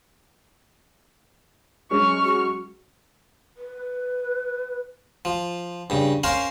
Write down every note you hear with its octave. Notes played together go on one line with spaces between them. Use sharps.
F#3 G#3 C#4 C#6 F6
F#4
B4
F3
G2 C#3
C#4 A#4 C5 F5